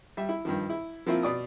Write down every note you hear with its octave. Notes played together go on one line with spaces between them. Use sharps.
G3 E5
E4
G2 D#3 F3
E4
F3 A#3 C4 E4 F4
B2 D5 D#6